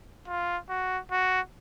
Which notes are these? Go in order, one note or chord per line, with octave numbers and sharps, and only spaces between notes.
F4
F#4
F#4